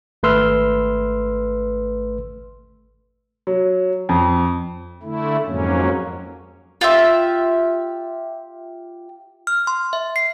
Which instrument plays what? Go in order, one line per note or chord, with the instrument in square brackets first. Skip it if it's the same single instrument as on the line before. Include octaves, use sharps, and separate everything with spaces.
[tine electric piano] G#1 A3 B4 C6 E6 F6
[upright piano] F#3
F2
[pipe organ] D3 A3 E4
F2 G#2 F#3 A#3 C#4
[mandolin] F4 G4 E5
[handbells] F6
C6
E5
C7